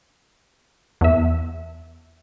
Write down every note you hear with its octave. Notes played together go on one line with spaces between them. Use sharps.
E2 E5